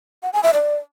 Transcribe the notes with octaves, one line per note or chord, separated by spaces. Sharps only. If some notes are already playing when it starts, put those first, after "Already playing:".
F#5
G#5
E5
D5